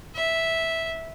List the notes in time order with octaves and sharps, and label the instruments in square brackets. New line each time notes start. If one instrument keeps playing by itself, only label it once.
[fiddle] E5